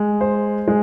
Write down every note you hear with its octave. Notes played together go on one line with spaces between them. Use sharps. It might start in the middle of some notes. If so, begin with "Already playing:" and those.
Already playing: G#3
C5
G#3